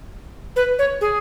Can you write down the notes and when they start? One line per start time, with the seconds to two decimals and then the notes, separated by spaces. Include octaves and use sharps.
0.56 B4
0.79 C#5
1.01 G#4